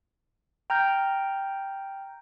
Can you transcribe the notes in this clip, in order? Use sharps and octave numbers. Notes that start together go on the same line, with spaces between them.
G5 A#5 F6 G6